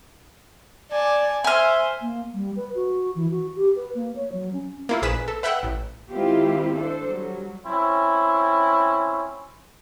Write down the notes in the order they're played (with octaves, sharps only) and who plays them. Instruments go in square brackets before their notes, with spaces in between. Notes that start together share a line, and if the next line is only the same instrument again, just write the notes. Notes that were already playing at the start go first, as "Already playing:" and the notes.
[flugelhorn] D5 [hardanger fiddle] G#5 A5
[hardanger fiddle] C5 [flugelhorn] E5 [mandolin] G#5 F6
[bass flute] A#3
G3
B4
F#4
E3
F#4
G4
B4
A#3
C#5
F#3
C#4
[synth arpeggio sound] A#3 E4 F4
A#1 G#4 B4 B6 E7
A4
B4 E5 F#5 G5 E6 F#6
A1
[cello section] D#3 G#3 C4 E4 F4 G4
D4 A4 C5
F#3 G3
[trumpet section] C4 C#4 E4